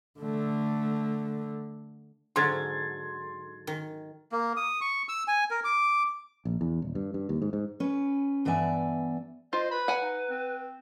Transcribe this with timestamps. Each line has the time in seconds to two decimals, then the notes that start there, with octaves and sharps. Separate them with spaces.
0.20 D3 A3
2.36 G#2 D3 F#3 C6 G#6 A6
3.67 D#3
4.32 A#3
4.57 D#6
4.81 C#6
5.09 E6
5.28 G#5
5.51 A#4
5.64 D6
6.45 A#1
6.61 E2
6.82 D#1
6.95 G2
7.14 G2
7.29 D#2
7.42 G#2
7.53 G#2
7.80 C#4 B4
8.45 G2 E3 B3 D5 E5 G#5
9.53 F4 C5 D#5
9.71 B4 B5
9.88 F#5 G#5
10.02 D#4
10.30 C4